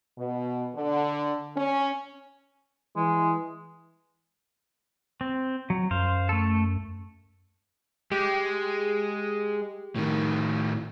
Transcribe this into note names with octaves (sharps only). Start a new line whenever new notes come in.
B2
D3
C#4
E3 G#3
C4
F#3
F#2 C5 F5
A3 A4
G#3 G4
A2 D#3